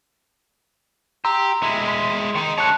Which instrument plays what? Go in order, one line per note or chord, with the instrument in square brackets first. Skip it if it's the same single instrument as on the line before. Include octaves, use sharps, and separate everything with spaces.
[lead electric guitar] G4 [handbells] A#5 C6 E6
[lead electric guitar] G#3 E4
[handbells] C6 B6
[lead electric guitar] D#3 D#4
[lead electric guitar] D3 C#5 [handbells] A5 F#6